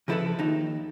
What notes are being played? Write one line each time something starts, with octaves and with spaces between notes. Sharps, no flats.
C#3 F3 E4 F4 A4 B4
D#2 D#4